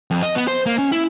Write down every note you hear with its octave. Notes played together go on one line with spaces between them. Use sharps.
F2
D#5
B3
C5
A#3
C#4
E4